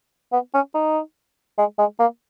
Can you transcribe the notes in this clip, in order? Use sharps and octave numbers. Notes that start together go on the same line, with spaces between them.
B3
C#4
D#4
G#3
G#3
A#3